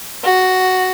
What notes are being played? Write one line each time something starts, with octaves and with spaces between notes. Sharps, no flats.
F#4